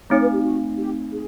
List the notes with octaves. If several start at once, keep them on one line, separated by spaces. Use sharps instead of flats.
A3 C4 D#4 C#5
B4
G4
F#4
G4
G#4